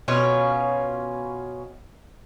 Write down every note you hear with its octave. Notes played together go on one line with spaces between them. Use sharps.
B2 C#4 F4 C#5